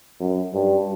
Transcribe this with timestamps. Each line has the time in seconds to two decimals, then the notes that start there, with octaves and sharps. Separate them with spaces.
0.20 F#2
0.54 G2